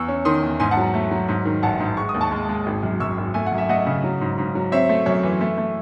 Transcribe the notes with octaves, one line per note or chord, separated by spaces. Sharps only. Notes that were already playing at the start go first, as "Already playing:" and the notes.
Already playing: E2 C#6 E6
C#4
D#3 C6 D#6
E2
G#2 G#5 C6
F#5 A5
F#3
A3
F#3
G#2
D#3
A1 F#5 A5
G#2
G#3 C#6
D#6
D#2
A5 C#6
G#3
G#3
G#1
F#2
F#2 C#6 E6
G#1
A3 G#5
F#5
F#2
E5
A3 D#5 F#5
C#3
F#3
G#2
G#2
F#3
C4 C#5 E5
A3
F#2 C#5
E3
A3
A3